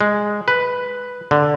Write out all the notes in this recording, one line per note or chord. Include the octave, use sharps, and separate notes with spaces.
G#3
B4
D3